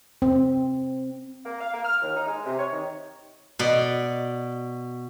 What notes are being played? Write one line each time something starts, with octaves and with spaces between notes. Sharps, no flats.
C4
A#3
F5
A#3
F6
D#2
D#4
G#3
C3
C#5
D#3
B2 D5